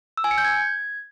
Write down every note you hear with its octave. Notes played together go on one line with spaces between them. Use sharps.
E6
G#5
C#7
G6
G#6